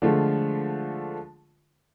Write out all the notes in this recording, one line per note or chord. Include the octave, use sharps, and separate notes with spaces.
D3 F3 G#3 A3 F4